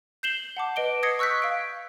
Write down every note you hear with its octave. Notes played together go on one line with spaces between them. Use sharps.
G6 C7 E7 F#7 G7
F#5 A5 D6
B4 D#5 D7 G7
D#6 G#6 A#6 C7 C#7
C#6 E6 F#6 G6 B6
F5 D7